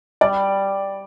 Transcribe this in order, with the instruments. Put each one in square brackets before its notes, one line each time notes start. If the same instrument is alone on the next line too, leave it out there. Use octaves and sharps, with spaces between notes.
[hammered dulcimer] G3 [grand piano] D5